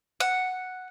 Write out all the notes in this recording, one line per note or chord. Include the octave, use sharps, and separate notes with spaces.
F#5